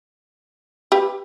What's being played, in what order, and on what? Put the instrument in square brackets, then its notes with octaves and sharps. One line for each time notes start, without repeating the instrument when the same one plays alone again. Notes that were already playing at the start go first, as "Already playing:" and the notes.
[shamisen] G4 B4